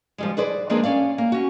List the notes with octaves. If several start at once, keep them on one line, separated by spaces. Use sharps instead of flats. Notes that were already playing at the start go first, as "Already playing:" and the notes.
F3 G3 G#3
G#4 B4 C5 D5
F3 G#3 A#3 C4 D4 G#4
C#4 D5 F5
A#3
C#4 F#4